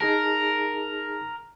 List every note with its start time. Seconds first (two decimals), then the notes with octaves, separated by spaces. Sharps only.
0.01 D#4 G#4 A#4 A5